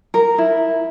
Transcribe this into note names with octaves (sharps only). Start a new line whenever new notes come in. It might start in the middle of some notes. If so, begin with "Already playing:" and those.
A#4
E4